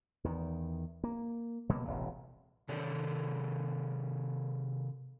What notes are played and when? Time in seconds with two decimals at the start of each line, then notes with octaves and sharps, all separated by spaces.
0.24 E2 D#3
1.04 A#3
1.69 B2 G3 A#3
1.86 E1 A1 C3
2.69 C3 D#3 A4 C#5 D5